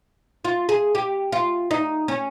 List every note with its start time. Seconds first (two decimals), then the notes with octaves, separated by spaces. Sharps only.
0.45 F4
0.69 G#4
0.95 G4
1.32 F4
1.71 D#4
2.08 C#4